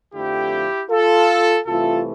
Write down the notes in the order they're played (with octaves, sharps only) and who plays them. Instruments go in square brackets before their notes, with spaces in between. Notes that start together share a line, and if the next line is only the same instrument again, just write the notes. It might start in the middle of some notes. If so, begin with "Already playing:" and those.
[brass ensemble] F2 D3 F3 A3 E4 G4
F4 A4
C2 C3 E3 A3 F4 A4